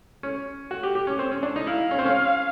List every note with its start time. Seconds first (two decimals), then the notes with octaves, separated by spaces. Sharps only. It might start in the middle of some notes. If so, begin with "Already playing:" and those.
0.23 C#4
0.71 F#4
0.83 G4
0.95 G4
1.07 C#4
1.19 C4
1.32 C#4
1.43 D4
1.56 D#4
1.67 E4 F5
1.91 C#4
1.99 C4
2.05 C#4